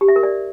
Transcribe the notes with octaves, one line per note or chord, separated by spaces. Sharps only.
G4
E5
A#4
D5